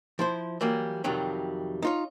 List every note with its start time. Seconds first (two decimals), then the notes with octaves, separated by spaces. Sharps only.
0.19 F3 E4 C5
0.61 E3 F#3 G3 A#3
1.04 F2 C3 D#3 F#3 G3
1.82 D#4 F4 C#5